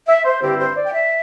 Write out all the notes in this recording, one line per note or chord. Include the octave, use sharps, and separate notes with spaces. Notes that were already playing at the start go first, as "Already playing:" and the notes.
E5
C5
G2 D3 C4 E4 G4
C5
D5
G5
E5